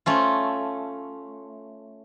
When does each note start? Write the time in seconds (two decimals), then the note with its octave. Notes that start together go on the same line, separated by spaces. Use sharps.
0.06 A3 C#4 F4